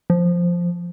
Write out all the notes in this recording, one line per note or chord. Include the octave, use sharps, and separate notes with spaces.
F3